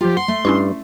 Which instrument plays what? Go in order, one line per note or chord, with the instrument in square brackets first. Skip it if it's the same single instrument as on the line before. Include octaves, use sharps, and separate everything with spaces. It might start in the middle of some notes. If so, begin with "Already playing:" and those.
[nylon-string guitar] F3 F4 [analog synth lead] G4
[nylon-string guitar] F#5 [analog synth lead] C6
[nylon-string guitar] A3
[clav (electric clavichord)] G2 [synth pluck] C#4 E4 C#6